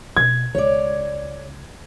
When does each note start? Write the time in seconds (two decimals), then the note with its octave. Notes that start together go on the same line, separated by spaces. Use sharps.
0.17 B2 G#6
0.55 C#2 C#5 D5